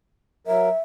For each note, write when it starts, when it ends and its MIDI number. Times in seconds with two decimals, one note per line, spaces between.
0.47 0.69 54
0.47 0.69 70
0.47 0.80 76